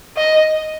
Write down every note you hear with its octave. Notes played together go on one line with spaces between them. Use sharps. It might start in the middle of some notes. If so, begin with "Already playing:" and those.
D#5